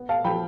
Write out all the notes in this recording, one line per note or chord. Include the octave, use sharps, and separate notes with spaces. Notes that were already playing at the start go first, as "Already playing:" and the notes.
Already playing: B3
F5 A5
F3 G5 B5